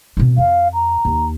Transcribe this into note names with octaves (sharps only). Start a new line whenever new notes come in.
B2 C4
F2 F5
A#5
D#2